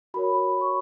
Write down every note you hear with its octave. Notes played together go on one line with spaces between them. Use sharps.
F#4 A#4 C#5 B5
C#6